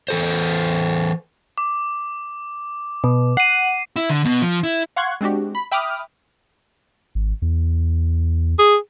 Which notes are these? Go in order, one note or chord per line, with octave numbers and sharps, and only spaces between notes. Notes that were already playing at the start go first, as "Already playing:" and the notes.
E3 A4 C5
D6
B2
F#5 C7 D#7
E4
D3
B2
F3
E4
F5 F#5 C6 C#6 F#6 G#6
G#3 C4 D4 F#4 G4
B5
E5 G5 B5 D6 D#6 F6
G#1
E2
G#4